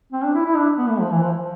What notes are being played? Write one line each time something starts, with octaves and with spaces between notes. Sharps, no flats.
C4
D4
E4
E4
D4
B3
A3
F3
E3
F3
F3